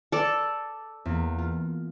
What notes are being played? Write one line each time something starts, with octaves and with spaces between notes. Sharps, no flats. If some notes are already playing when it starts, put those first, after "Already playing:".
A4 D5
E2 A#3
F4